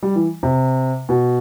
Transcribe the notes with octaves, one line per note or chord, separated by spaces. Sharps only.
G3
E3
C3
B2